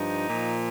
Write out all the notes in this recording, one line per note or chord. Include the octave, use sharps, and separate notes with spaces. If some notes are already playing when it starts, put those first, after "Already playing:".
Already playing: G2 F3 D#4
A#2 F3